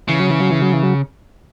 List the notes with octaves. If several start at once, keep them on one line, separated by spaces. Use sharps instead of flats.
C#3 E3
F#3
E3
F#3
E3
F#3
E3
F#3